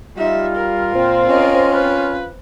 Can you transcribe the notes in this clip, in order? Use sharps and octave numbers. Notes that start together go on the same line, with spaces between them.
G3 D#4 F4 E5
A#4
A#2 C4
C#4 A#4 D#5
B4